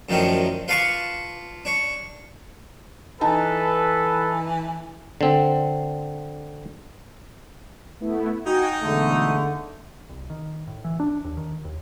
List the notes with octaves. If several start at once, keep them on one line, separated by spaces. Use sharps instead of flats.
F#2 A2 D#3 F3 C#4 D4
F4 B4 F5 A5 C#6 D6
D4 C#5
E3 D#4 A4 B4 A5
D3 C4
A3 B3 E4
D#4 F#4 G5 G#5
B1 E2 D3 G#3 A3
C2
D#3
A2
E3
D4
D#2
D#3
D#2